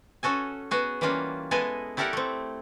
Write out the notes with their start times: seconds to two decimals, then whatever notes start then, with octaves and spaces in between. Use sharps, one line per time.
0.23 C#4 F#4 A4 G#5
0.71 B3 F#4 G#4
1.01 E3 G3 A#3 C#4 F4 F#4
1.51 G#3 B3 E4 A4 D#5 G#5
1.97 E4 G4 A4 A#4 D5 F#5
2.13 A3 C4